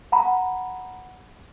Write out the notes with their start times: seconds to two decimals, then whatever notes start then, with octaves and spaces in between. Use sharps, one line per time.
0.12 F#5 A#5 B5